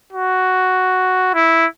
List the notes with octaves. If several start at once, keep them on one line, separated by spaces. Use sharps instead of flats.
F#4
E4